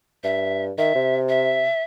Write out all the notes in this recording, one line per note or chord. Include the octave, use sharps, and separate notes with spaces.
G2 E5
D#3 E5
C3
E5